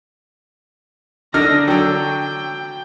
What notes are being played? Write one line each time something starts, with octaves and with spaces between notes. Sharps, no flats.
D3 D4 D#4 F6 A#6
D3 F#3 G5